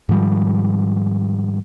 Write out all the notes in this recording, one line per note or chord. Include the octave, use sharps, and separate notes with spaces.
G#2 D#3 F3 G3